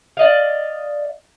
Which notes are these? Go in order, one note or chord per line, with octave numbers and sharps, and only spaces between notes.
D5 D#5 F5